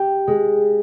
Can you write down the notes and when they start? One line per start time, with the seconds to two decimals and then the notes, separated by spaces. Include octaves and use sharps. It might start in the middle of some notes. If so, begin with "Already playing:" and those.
Already playing: G4
0.27 G#3